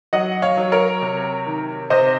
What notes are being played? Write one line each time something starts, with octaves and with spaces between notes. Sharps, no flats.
F#3 D#5 F#5
C#5 F5
F#3
A#4 C#5
C3
D#3
C3 C5 D#5